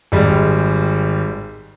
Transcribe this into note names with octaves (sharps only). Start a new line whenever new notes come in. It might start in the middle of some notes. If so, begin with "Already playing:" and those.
G#1 G3 G#3